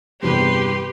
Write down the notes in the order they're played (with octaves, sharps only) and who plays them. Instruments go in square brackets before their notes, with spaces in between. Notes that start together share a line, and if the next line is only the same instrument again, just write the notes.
[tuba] E2 [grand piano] G2 C3 E3 [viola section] G4 [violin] B4 C6